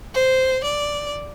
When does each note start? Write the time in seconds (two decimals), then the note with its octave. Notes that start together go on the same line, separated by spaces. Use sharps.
0.14 C5
0.64 D5